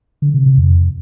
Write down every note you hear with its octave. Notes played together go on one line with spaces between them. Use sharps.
D3
C3
C3
F2